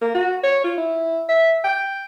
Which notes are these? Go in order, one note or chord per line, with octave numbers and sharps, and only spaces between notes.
A#3
F#4
C#5
F4
E4
E5
G5